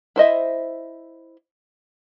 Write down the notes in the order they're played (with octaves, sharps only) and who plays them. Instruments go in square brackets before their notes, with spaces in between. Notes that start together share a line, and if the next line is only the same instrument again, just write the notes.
[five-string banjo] E4 C5 D#5 E5